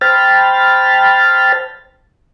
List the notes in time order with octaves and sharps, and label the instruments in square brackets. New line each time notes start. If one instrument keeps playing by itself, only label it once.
[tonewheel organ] C5 G5 A5 B5 F6 A6